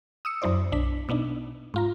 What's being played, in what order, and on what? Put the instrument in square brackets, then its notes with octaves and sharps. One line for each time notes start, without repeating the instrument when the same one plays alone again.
[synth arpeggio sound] D#6 E6 C#7
F#2 F#3 E4 C5 D5
B1 D4 B6
B2 B3 D4 D#4
G#2 F4 A#5